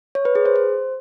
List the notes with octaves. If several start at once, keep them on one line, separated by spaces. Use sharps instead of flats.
C#5
B4
G#4
C5
C5